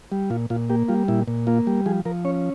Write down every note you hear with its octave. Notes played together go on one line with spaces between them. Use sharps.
G3
A#2 F4
A#2 F4
A#3 G4
G3 F4
A#2 E4
A#2
A#3 F4
G3
F3 G#4
F3 A#4
C#4 C#5